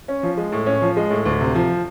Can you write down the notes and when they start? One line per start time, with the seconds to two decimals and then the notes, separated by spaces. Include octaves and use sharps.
0.08 C#4
0.23 F3
0.37 G#3
0.52 A2
0.66 C#4
0.82 F3
0.97 G#3
1.11 A2
1.25 D2
1.41 C3
1.55 F3